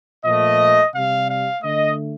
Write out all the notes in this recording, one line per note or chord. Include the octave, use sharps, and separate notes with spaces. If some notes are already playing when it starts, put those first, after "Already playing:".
A#2 F3 A3 D#5
C3 G3 F5
F5
D3 A3 D#5